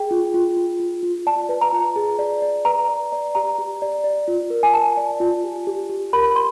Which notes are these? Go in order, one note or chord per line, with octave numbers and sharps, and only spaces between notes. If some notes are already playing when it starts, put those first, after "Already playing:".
Already playing: G#4 G5
F4
F4
F4
F4
F4
D5 A5
B4
A#5
F4
G#4
D5
D5
B4 A#5
D5
D5
G4 A#5
G4
D5
D5
F4
A#4
G#5
A#4 A5
D5
F4
G4
G4
G4
A#4 B5
C6